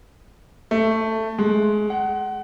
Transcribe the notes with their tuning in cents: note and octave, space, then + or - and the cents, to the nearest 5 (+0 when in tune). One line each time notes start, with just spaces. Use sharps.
A3 +10
G#3 +20
F#5 +25